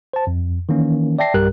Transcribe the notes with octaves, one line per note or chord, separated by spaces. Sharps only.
C5 A5
F2
D#3 E3 A#3 C#4
D5 E5 G5 A5 A#6 C7
B1 G2 G3 G4 A#4 F#6